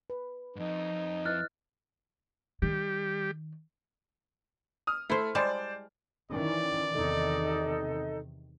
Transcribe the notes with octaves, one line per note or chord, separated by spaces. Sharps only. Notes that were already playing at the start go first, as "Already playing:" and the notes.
B4
F2 G#2 D#4
E4 B4 D#5 F6 F#6 A6
D#3 G3 G4
D#6 F6
A3 E4 C5
G3 G#3 C5 D5 A5
D#3 E3 C#4 D5
E2 C3 D#3 D#4 A4 D#5